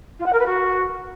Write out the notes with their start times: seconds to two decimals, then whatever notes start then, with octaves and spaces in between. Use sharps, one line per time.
0.19 F4
0.26 F#5
0.33 A#4
0.39 B4
0.46 F#4